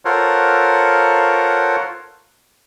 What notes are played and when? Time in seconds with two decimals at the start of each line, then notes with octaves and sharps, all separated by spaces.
0.05 F4 A4 A#4 C5 C#5 F#5